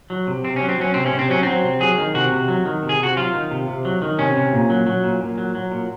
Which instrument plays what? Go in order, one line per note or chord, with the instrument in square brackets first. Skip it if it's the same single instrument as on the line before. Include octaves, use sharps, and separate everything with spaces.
[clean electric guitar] F#3
C3
C3 C4
C#4
F#3
C4
F#3 C#4
C3 C4
C#4
C3
C4
F#3 C#4
F#3 C4
C3
F#3 G#4
D#3
C3 F#4
C3
F#3
D#3
C3
G#4
C3 F#4
F#3 F4
D#3
C3
C3
F#3
D#3
C3 C#4
C3
A#2
F#3
F#3
A#2
A#2
F#3
F#3
A#2